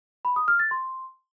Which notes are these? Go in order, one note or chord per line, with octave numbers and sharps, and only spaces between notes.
B5
D#6
F6
A6
C6